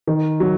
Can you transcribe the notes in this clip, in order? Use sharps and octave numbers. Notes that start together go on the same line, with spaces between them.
D#3
F#3